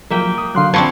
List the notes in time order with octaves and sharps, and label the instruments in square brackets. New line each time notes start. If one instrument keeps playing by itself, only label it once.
[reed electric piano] F3 F#3 [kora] A#3 E5 G5
[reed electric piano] D#6
[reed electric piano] D3 F#3 [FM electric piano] F5 C6 F#6
[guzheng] F3 C4 D4 [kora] C#5 [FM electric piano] A5 B5 C#6